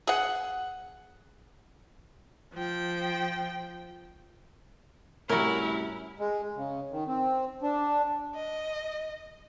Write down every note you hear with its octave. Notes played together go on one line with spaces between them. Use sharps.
G#4 F#5
F3 G5
A2 C3 G3 C#4 E4 F#4 A#4
G#3
C#3
D#3
C4
D4
D#5